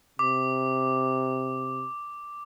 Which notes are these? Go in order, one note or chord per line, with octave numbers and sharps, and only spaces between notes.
C3 D6